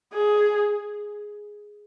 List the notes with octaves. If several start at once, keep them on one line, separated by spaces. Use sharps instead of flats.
G#4